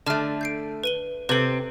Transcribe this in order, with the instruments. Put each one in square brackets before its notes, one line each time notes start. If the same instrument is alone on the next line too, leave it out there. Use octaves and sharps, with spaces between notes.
[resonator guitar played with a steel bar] D3 A3 [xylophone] A5 F6
[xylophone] G6 C7 D7
B4 D#7 G7
[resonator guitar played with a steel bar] C3 C4 [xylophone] A4 B4